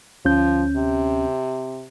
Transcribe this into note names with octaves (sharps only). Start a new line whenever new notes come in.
D2 F3 C#4 G6
C3